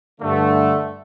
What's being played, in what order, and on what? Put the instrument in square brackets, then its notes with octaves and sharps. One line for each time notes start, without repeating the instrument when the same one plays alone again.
[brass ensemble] G2 D3 A3